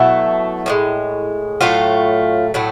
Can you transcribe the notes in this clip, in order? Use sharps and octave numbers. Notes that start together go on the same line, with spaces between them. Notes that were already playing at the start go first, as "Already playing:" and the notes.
Already playing: B2 F#3 A3 E4 E5
A2 F3 G#3
A2 F#3 A3 F4 F5
A2 F#3 A3